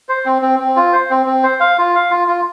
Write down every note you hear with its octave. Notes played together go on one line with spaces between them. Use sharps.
C5
C4
C4
C4
F4
C5
C4
C4
C5
F5
F4
F5
F4
F4